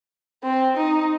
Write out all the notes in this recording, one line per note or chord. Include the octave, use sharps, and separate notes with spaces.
C4
D#4